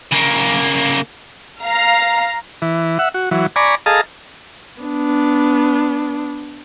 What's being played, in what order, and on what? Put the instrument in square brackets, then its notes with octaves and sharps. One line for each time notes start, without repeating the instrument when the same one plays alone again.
[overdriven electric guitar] C#3 A#3
[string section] F5 A#5
[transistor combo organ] E3
E5 F#5
F#4
E3 F#3
D5 G#5 A#5 B5 C#6
G#4 A4 D#5 F5 A5 A#5
[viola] B3 D4